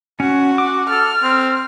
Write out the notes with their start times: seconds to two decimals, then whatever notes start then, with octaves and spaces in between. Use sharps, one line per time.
0.20 C#4 F#4
0.58 D6
0.90 A4 F6
1.23 C4